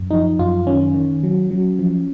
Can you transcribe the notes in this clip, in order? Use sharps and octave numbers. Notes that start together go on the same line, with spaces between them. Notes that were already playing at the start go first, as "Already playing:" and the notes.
Already playing: F#2
F3 D#4
F#2 F4
D#3 C#4
D#3
F#3
F#3
F3